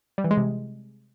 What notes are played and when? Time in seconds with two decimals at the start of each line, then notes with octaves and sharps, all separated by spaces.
0.18 G3
0.24 E3
0.31 G#3
0.37 C3